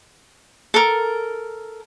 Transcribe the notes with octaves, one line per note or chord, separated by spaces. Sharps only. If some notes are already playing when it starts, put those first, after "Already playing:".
A4 A#4